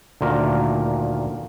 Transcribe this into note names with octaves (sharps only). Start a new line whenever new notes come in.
D2 A#2 D#3 A#4